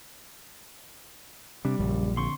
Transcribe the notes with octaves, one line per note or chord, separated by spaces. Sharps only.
C3 G3 D4
A#1 F#2 C#3
D3 C4 C6 C#6